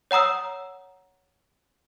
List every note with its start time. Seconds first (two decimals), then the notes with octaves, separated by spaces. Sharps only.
0.11 C#5 F#5 A#5 D#6 E6